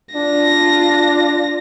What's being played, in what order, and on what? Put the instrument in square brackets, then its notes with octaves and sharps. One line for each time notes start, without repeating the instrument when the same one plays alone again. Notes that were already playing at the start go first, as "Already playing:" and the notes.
[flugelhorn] D4 [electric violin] F4 A#6